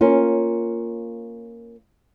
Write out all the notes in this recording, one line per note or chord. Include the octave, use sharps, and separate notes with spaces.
A#3 C#4 F4